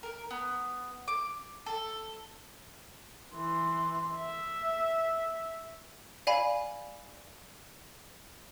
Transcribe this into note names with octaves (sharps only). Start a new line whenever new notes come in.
A#4
B3
D6
A4
E3 C6
E5
D5 F5 G#5 B5